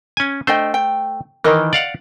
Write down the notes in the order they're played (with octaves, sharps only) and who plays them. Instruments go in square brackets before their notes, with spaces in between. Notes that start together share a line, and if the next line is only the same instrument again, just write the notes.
[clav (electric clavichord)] C#4 G#5
[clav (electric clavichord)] A3 C5 [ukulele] D4 D#5 G5
[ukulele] G5
[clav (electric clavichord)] D#3 E3 [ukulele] A#4 D#5
[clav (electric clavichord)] D5 F5 F#5